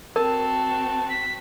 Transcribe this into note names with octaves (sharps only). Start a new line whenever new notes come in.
C4 F#4 A#4 A5
B6